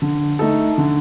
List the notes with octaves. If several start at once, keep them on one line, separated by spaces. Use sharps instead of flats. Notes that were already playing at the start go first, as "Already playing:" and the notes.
D3
A3 D#4 A4
D3